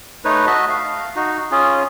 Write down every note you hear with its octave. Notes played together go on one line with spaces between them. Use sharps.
A3 D#4 B4 C#5
F#4 D#5 E5 A5
F5
D#4 F#4
C#4 F4 G#4